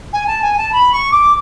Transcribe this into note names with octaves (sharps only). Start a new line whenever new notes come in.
G#5
A5
G#5
A5
B5
C#6
D6